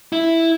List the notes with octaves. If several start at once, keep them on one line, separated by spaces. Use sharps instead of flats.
E4